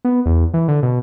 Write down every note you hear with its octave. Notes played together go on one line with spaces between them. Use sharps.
B3
E2
E3
D3
B2